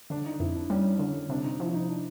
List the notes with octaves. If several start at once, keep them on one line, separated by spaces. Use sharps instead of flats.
D3 D4
D#4
F2 E4
D4
G3 C#4
D3 C#4
C3 D4
D#4
F3 E4
D#4
D4